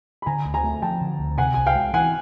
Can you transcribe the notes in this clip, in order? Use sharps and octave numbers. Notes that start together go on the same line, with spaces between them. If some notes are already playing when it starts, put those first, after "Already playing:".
B5
D3 G#5 A#5
D2
G#5 A#5
A3
F3 G5 A5
D3
D2
C3 F#5 G#5
C2 G#5
F5 G5
G#3
E3 F#5 G#5